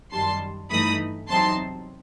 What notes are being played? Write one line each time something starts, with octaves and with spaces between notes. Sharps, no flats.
F#2 D#3 G3 A5 C6
G2 E3 A3 D#4 B5 D#6
E2 C3 F#3 C4 D#4 A5 C6